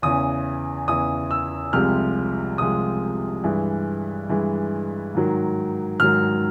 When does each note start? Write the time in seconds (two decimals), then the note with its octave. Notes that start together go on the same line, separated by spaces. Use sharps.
0.02 E2 C#3 E3 D#6
0.88 E2 C#3 E3 D#6
1.31 E6
1.73 C2 C3 F3 G#3 F6
2.58 C2 C3 F3 G#3 D#6
3.44 G2 E3 G#3
4.29 G2 E3 G#3
5.15 G#2 D#3 F#3
6.00 G#2 D#3 F#3 F6